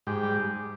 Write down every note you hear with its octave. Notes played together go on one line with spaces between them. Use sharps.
G#2 G4
G3